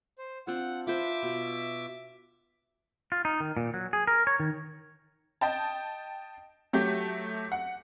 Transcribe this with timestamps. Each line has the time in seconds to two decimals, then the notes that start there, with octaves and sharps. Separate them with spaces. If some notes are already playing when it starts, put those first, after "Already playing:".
0.18 C5
0.47 C4 D4 F4 F#5
0.87 F4 B4 C5 E5 D6
1.23 B2
3.12 F4
3.25 D#4
3.40 D#3
3.57 A#2
3.74 F#3
3.93 G#4
4.07 A#4
4.27 C#5
4.40 D#3
5.41 D#5 G5 A5
6.73 F#3 A3 G4
7.52 F#5